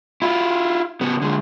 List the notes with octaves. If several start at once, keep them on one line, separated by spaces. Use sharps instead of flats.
E4 F4
C#3 B3
D3 G#3